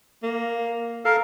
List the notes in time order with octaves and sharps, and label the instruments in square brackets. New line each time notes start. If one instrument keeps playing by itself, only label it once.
[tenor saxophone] A#3
[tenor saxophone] A4 [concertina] A#4 F5